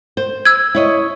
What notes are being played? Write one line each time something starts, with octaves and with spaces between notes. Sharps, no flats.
C5
E6 G#6
E4 C#5 D#5